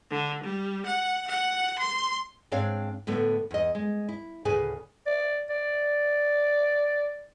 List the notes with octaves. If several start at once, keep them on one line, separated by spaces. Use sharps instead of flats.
D3
G3
F#5
F#5
C6
G#2 C4 D4 C#5 F5
A2 D3 A3 B3
E2 D#5
G#3
E4
D2 A2 C#3 G#4 B4 G#5
D5
D5